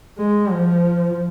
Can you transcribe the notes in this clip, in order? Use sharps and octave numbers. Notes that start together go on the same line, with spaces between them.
G#3
F3